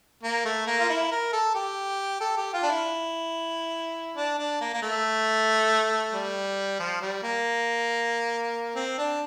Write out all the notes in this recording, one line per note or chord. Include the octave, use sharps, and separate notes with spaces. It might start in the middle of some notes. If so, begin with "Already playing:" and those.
A#3
A3
A#3
F4
E4
A#4
A4
G4
A4
G4
F4
D4
E4
D4
D4
A#3
A#3
A3
G3
F3
G3
A#3
C4
D4